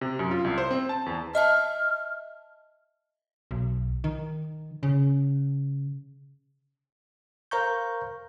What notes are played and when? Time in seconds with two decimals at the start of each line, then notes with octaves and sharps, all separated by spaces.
0.01 C3
0.19 F#2
0.31 F4
0.44 C2
0.58 C5
0.71 C4
0.89 A5
1.06 E2
1.35 D#5 E5 A5 F6
3.51 B1
4.04 D#3
4.83 C#3
7.51 A#4 C5 F5 A#5 C#6 G6